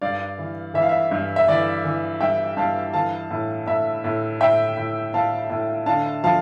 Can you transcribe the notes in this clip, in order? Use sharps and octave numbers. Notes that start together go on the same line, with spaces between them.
G2 D5 F5
E3
E3 E5
F5
E5
G2
E5
E3 D5
E3
G2 E5 G5
G2 F5 A5
E3 F5 A5
A2
A2 E5
A2
A2 E5 G5
A2
A2 F5 A5
A2
D3 F5 A5
F3 F5 A5